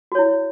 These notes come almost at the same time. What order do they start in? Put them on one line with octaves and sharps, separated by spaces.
F#4 C#5 E4